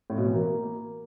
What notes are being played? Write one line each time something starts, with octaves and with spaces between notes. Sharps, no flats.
A2
B2
E3
A#3